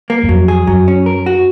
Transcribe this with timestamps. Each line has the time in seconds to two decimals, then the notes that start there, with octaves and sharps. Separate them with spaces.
0.10 A#3
0.23 F#2
0.29 F2 F#3
0.48 G#4
0.67 F#2 F#3
0.88 C#4
1.06 A#4
1.26 F#4